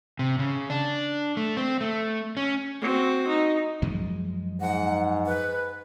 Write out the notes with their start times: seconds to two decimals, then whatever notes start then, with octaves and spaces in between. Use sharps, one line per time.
0.19 C3
0.39 C#3
0.70 D4
1.37 A3
1.57 C4
1.81 A3
2.37 C#4
2.81 C4 F#4
3.27 D#4
3.82 F#2 F3 G#3
4.61 G#2 F#5
5.26 B4